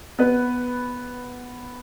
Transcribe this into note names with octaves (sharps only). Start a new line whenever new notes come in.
B3 B4